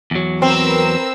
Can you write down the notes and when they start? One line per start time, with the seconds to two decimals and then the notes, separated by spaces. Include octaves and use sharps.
0.11 E2 F#3
0.42 C4 A#4 B4 E6